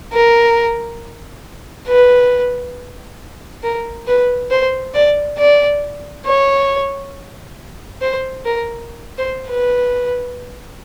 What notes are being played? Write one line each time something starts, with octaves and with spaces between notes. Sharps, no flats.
A#4
B4
A#4
B4
C5
D5
D5
C#5
C5
A#4
C5
B4